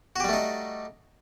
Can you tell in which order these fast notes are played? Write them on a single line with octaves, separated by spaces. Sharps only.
F#4 G4 G3 A3 D#4